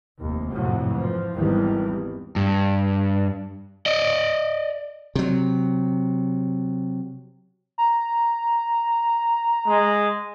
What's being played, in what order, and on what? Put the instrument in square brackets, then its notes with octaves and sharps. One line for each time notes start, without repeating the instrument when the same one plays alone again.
[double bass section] F1 D#2
G#1 F2 A2 C3 F#3
E3 F3
G#1 E2 D#3 E3 G3
[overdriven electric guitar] G2
D5 D#5
[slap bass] C3 F#3
[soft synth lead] A#5
[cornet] G#3